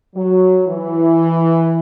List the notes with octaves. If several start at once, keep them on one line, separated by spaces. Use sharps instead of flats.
F#3
E3